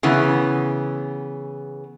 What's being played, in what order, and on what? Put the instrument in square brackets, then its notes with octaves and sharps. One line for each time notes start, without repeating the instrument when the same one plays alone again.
[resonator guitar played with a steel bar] C#3 E3 B3